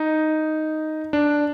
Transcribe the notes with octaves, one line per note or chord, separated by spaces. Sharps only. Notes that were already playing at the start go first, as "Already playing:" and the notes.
Already playing: D#4
D4